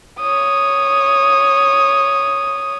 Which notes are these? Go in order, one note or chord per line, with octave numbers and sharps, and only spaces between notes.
C#5 D#6